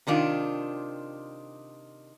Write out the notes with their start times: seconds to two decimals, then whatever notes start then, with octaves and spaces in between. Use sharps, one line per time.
0.07 C3 D#3 D4 F4